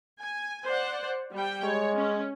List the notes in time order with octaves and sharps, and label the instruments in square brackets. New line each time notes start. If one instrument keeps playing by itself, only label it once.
[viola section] G#5
C5 D5 F#5
G3 G5
[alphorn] G#3 [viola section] C#5
[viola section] C#4